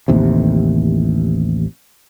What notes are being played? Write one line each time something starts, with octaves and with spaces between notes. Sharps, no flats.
A1 D#2 C3